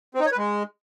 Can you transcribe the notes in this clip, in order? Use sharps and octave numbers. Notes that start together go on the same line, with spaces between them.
C4
D#4
C#5
B4
G#3